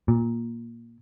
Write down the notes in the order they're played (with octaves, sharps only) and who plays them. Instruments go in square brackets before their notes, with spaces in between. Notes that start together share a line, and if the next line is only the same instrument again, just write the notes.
[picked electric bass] A#2